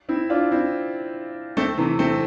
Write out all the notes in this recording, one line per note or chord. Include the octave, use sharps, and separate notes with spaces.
C4 E4
D4 F4
C4 E4
A3 C4
C3 E3
A3 C4